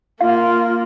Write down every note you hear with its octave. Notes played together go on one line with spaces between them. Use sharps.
A#3 F4 F5